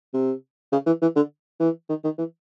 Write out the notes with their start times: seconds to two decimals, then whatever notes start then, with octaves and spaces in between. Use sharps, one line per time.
0.14 C3
0.72 C#3
0.86 E3
1.02 E3
1.16 D3
1.60 E3
1.89 D#3
2.04 D#3
2.18 E3